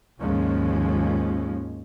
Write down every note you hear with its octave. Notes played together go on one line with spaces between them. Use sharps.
D#2 G#2 F3 G#3 C#4